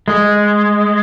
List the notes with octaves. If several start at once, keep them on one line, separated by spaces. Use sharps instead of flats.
G#3